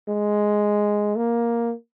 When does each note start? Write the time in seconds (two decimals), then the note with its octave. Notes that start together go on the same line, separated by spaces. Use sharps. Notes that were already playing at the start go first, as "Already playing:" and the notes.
0.09 G#3
1.16 A#3